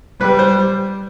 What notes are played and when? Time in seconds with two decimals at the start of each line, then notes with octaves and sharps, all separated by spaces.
0.20 G3 B4
0.39 C5